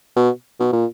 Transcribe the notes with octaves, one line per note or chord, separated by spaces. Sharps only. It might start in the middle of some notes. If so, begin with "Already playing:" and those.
B2
B2
A#2